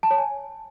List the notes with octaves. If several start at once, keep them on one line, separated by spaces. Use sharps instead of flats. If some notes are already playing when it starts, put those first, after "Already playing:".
A5
C#5
G#5